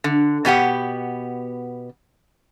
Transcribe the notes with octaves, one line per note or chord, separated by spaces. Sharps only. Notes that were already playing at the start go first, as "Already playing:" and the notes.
D3
B2 B3 G4 F#5